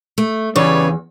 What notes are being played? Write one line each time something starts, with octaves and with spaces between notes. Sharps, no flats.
A3
E2 C#3 G3 B4 C#5 D5